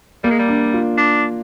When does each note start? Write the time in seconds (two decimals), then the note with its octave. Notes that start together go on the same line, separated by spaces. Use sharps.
0.24 G3 A#3
0.31 G#3
0.39 G3
0.49 D4
0.74 F4
0.97 D4